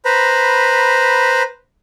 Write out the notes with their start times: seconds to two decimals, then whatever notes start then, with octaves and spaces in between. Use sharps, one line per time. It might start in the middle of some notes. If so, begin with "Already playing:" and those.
0.05 B4 C5 A#5 B5